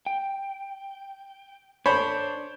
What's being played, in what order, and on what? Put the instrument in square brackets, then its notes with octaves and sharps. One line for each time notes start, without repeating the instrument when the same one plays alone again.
[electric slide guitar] G5
[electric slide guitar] D4 [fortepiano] C5 C#5 B5